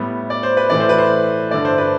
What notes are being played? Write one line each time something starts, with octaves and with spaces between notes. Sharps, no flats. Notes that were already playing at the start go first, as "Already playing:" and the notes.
Already playing: A2 G3 B3
D5
C5
B4
A2 E3 A3 D5
C5
B4
C5
G2 D3 A3 D5
C5
B4